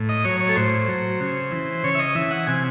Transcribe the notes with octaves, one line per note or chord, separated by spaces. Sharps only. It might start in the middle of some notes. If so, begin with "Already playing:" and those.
Already playing: A2
D#5
F#3 C#5
C#5
A4
A2 C5
F#3
C#3
E3
C#3 C#5
E5
D#5
E3 E5
F#5
C3 G#5